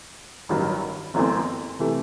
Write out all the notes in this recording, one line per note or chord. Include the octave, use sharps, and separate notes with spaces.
A1 G2 D#3 F#3
G1 F#2 E3 A3 C4
C3 E3 A3